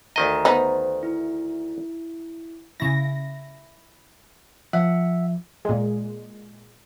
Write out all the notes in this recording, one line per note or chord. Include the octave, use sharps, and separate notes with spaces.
D2 D#3 A#4 D#5 A#5
B3 D#4 C5
E4
C#3 E4 A#6
F3 E5 F#5
A#2 G#3